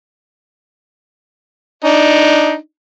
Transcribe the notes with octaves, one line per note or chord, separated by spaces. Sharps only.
D4 D#4